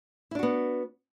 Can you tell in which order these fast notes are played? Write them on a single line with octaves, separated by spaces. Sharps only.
E4 D4 F#4 B3